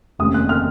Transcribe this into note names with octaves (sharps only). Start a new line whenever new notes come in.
F1 D#2 C#3 A3 C4 D#6
F#6
F6